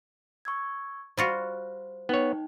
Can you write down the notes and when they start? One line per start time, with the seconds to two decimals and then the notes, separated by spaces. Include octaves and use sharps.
0.45 C#6 E6 G#6
1.17 G3 F4 F#4 C5
2.09 B3 D#4 C#5 G5